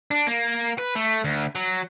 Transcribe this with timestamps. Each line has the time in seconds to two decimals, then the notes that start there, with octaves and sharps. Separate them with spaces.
0.11 D4
0.27 A#3
0.78 B4
0.96 A3
1.24 D2
1.55 F#3